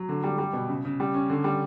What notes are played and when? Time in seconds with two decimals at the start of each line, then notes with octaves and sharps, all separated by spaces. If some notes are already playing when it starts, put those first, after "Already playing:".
Already playing: F#3
0.09 D3
0.24 G3
0.38 G3
0.53 B2
0.68 C#3
0.85 C#3
1.00 G3
1.14 C#4
1.30 D3
1.44 G3